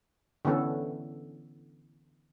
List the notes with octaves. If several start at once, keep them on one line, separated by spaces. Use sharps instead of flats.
D3 E3 B3 C#4 A4